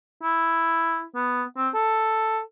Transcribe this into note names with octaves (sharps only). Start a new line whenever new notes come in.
E4
B3
C4
A4